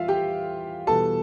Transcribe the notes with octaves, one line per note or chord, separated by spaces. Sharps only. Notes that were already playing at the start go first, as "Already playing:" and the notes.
Already playing: E2 G3 F4 E5 F5
G4 G5
E2 B2 G3 A4 A5